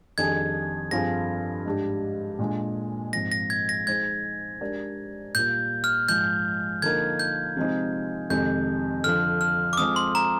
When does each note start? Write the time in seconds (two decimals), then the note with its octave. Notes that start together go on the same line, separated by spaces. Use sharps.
0.18 F2 D#3 G3 D4 G#4 G#6
0.91 G2 F3 C4 F4 G#4 A#6
1.65 G#2 G3 D4 G4
2.39 A#2 G#3 D4
3.13 G#2 F3 C4 A#6
3.32 A#6
3.50 G#6
3.69 A#6
3.87 G#3 D#4 G#4 C5 G#6
4.61 G#3 D4 G4 A#4 D5
5.35 A#2 G3 A#3 F4 A#4 G6
5.84 F6
6.09 G#2 F3 G#3 G6
6.82 D3 F3 A#3 D#4 A#4 G#6
7.19 G6
7.56 C3 F3 G#3 C4 D#4
8.30 F2 C3 D#3 G#3 G6
9.04 F2 D3 F3 F6
9.41 F6
9.73 D6
9.77 F3 G#3 C4 D#6
9.96 C6
10.15 A#5